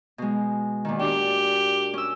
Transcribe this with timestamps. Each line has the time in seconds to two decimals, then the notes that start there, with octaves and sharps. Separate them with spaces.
0.18 B2 G#3
0.85 A#2 D#3
0.99 D4 F#4 G4
1.94 C#4 E6